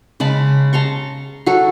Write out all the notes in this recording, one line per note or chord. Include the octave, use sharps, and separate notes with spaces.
C#3 G#3 A5 B5
A5 A#5 C6 C#6
F#3 F#4 A4 C#5